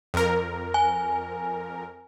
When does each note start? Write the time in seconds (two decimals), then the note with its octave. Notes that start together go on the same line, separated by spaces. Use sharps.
0.14 F2 A#4
0.74 G#5